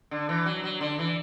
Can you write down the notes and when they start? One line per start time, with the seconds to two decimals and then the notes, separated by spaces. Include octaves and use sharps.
0.11 D3
0.29 E3
0.46 F#3
0.64 F#3
0.81 D3
0.99 E3